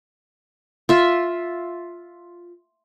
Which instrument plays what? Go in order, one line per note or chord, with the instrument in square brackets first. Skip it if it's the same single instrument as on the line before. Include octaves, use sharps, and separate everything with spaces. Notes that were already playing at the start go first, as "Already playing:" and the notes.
[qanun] F4 E5